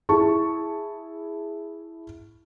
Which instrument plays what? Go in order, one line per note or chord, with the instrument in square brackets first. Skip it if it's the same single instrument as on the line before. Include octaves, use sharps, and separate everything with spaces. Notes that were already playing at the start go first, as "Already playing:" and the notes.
[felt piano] E4 G#4 A5 C#6